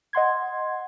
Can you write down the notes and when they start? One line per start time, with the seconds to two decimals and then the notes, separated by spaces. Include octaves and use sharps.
0.13 D#5 F#5 C6 G#6